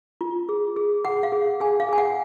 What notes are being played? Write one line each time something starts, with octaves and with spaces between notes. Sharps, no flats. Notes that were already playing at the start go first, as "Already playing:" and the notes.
F4
G#4
G#4
G#4 F#5
F5
G#4
G#4 G#5
F5
G#4 G#5
F#5